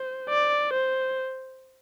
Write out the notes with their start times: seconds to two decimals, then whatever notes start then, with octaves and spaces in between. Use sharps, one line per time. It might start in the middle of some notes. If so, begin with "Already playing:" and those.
Already playing: C5
0.29 D5
0.73 C5